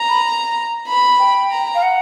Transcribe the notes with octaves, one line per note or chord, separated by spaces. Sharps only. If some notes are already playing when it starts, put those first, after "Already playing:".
Already playing: A#5
B5
B5
G5
A#5
F5
F#5